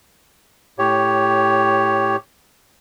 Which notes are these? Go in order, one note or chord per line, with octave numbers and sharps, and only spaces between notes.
A2 G4 C#5